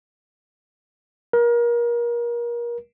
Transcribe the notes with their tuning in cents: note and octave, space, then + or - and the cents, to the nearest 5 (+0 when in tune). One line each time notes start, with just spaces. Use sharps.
A#4 +30